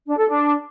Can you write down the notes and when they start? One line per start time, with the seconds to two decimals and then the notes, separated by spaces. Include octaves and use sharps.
0.07 D4
0.18 A4
0.28 D4